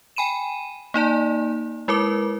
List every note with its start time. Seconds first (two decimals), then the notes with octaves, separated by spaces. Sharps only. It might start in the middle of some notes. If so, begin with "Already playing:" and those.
0.16 G5 G#5 B5 D#7 E7
0.94 A#3 D#4 D5 A5
1.88 G#3 E4 A#4 B4 D6